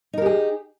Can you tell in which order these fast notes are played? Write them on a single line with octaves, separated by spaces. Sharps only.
D#4 A#4 G4 G#4